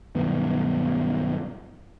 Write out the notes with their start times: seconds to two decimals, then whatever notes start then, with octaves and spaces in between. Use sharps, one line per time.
0.15 B1 G2 D#3 B3